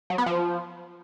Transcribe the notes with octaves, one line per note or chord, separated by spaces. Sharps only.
F#3
B3
F3